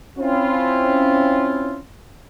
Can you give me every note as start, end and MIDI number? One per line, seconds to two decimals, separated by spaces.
0.18 1.78 60
0.18 1.78 61
0.18 1.78 64
0.18 1.78 65